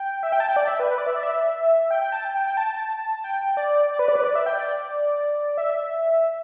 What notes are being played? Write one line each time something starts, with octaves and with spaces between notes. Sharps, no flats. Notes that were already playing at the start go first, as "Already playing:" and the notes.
Already playing: G5
E5
G5
A5
G5
D5
E5
B4
B4
D5
E5
D5
E5
G5
G5
A5
G5
G5
G5
A5
G5
D5
D5
B4
D5
B4
D5
E5
G5
D5
E5